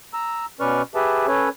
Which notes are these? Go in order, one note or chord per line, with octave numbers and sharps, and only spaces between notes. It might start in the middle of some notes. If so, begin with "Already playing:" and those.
A#5 E6
B2 C#4 B4 D5 C#6 F6
G4 G#4 B4 E5 A5
C#4 A4 B4 C#5